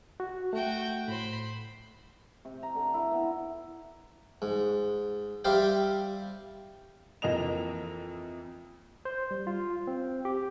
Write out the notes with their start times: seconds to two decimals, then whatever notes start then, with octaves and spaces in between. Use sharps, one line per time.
0.20 F#4
0.53 A3 F#4 G5
1.08 A2 C5 B5
2.45 C3
2.63 A#5
2.75 D3
2.94 E4
3.11 B3
4.42 G#2
5.45 G3 G4 C5 E5 F5 G5
7.22 F2 E3 A#3 D#5 F7
9.05 C5
9.31 G3
9.47 F4
9.87 C4
10.25 G4